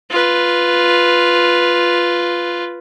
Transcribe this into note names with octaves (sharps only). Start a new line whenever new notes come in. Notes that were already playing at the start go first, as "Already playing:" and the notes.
F4 B4